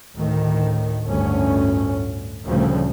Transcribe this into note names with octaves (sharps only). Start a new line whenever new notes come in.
D2 A2 D#3
G1 D2 A2 C#4
D2 A#2 C#3 F3 G3 A3